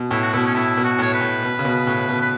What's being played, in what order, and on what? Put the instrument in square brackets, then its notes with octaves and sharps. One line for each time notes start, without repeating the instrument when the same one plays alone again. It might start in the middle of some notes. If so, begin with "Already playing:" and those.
Already playing: [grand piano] B2
[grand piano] A2 [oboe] E4
[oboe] F#4
[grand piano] B2 [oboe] E4
[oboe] C#4
[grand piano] A2 [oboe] E4
[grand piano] B2
[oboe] F#4
[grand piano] A2
[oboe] C#5
B4
[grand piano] A2
B2
C#3
B2
A2
B2
[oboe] B4